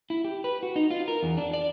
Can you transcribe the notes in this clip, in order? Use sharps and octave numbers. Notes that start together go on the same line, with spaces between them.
E4
G4
B4
F#4
D#4
F4
A#4
E2
D4
D5